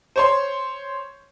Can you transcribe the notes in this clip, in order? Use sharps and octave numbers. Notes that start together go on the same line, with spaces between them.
C5 C#5 C6